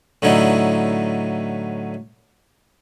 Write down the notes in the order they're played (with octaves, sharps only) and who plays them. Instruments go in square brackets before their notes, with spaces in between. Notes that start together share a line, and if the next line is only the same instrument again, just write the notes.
[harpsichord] A2 D3 F#3 D#4 E4